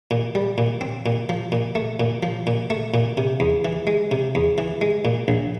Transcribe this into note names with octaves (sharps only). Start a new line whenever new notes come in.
A#2
G3
A#2
C4
A#2
F3
A#2
A3
A#2
F3
A#2
A3
A#2
C3
E2
E3
G#3
C3
E2
E3
G#3
A#2
A#1